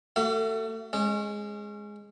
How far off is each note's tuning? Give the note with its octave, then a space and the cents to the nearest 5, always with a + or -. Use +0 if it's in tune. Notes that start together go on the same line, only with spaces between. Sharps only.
A3 +25 F#4 +40 F5 -45
G#3 +0 C#4 -25